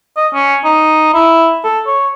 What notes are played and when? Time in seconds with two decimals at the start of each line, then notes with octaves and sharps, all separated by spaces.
0.17 D#5
0.34 C#4
0.64 D#4
1.14 E4
1.64 A4
1.87 C#5